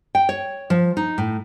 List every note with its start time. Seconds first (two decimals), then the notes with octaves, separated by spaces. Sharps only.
0.15 G5
0.29 C#5
0.70 F3
0.97 D#4
1.18 A2